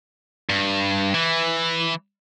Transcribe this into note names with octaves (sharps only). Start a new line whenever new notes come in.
G2
E3